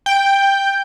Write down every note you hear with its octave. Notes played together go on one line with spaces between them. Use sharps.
G5